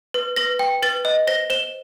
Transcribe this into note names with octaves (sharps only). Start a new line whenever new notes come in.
B4
B4 A#6
G5
B4 A6
D#5
C5 A#6
C5 E7